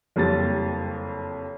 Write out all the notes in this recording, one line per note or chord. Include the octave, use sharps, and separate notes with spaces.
F#1 F2 G3 A6